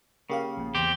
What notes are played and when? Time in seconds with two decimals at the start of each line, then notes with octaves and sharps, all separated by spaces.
0.30 C#3 A#3 G4 F5
0.57 A#1 A#2
0.75 E2 C4 G4